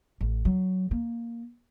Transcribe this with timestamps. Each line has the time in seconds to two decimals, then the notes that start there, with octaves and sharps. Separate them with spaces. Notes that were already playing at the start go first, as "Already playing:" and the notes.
0.21 A1
0.45 F#3
0.91 A#3